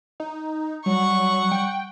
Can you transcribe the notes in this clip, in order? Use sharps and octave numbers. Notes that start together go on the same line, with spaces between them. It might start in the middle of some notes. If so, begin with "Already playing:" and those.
D#4
F#3 G3 F#5 C#6
G5